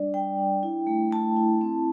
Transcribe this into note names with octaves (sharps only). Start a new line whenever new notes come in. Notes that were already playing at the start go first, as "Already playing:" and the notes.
Already playing: G3 D4 D5
G3 G5
D4
E4
A3
A3 A5
E4
C4